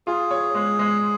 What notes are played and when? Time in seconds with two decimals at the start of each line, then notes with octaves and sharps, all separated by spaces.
0.07 F4 G#4
0.31 C#5
0.55 G#3
0.79 G#3